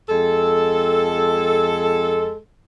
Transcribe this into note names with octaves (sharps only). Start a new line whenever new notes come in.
F2 G#3 A4